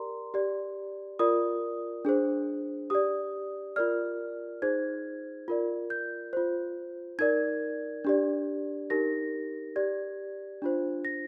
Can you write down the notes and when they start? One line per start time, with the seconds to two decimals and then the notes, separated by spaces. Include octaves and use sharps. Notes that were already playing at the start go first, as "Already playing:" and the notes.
Already playing: G4 A#4 D5 A#5 C6
0.34 G4 D5
1.19 F4 A#4 D5 D#6
2.05 D4 G#4 C5
2.90 G4 D5 D#6
3.76 F4 A#4 D5 F6
4.62 D#4 G#4 C5 G#6
5.48 F4 A#4 D5
5.90 G6
6.33 F4 C5
7.19 D#4 A#4 D5 G#6
8.05 D4 G4 D5
8.90 D#4 G4 A#4 A#6
9.76 G4 D5 G#6
10.62 D4 F4 C5
11.05 A#6